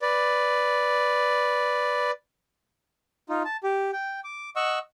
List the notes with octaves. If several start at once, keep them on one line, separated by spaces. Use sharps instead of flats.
B4 D5
D#4 F4
A5
G4
G5
D6
D#5 F#5 C#6 E6